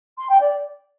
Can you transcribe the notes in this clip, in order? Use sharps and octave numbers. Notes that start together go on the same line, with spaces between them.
C6
G5
D5